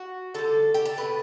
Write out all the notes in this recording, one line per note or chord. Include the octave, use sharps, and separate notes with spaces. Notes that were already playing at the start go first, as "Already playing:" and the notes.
Already playing: F#4
D3 G3 A4
G4
A4
B2 A3 B4